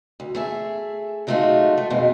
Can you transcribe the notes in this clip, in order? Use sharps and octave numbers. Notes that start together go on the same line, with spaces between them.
D2
A3 G#4 E5
F#3 G#3 A3 D#4 F4 F#4
A3
F2 B2 G#3 C4